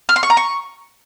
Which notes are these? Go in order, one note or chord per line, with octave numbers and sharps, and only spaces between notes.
F6
C6
C#6
A#5
C#6